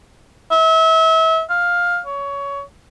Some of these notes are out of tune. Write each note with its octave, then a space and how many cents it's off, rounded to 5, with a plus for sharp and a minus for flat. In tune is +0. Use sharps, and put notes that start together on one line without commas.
E5 -30
F5 +10
C#5 +20